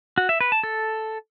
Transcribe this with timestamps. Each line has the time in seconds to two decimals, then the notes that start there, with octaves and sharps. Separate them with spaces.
0.18 F#4
0.29 E5
0.41 B4
0.52 A5
0.63 A4